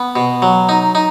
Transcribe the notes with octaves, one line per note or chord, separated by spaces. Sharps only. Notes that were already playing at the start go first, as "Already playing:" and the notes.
Already playing: B3
B2
F#3
D#4
D#4